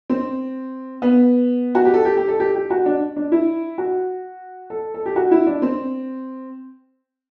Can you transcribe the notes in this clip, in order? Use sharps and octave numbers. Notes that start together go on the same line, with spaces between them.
C4
B3
F#4
G4
A4
G4
G4
A4
G4
G4
F#4
D4
D4
E4
F#4
A4
A4
G4
F#4
E4
D4
C4